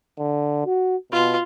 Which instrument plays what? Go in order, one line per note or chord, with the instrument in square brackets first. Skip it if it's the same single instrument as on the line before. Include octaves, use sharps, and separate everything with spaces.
[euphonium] D3
F#4
[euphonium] B2 [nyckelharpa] F4